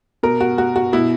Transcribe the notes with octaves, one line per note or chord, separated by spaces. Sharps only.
B2 A#4
F#4
F#4
F#4
B2 E4